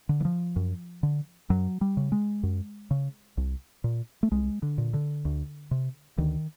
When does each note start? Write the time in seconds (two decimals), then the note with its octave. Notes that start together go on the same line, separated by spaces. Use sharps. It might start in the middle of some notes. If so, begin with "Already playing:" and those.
0.09 D3
0.21 E3
0.25 F3
0.56 F#2
1.03 D3
1.50 F#2 F#3
1.81 G3
1.97 C#3
2.12 G#3
2.43 F#2
2.91 C#3
3.37 C2
3.84 A#2
4.23 A3
4.32 C2 G#3
4.62 D3
4.78 A#2
4.94 D3
5.25 D2
5.71 C3
6.18 D2 D#3